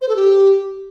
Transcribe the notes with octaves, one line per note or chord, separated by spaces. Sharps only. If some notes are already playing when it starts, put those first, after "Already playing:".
C5
A4
G4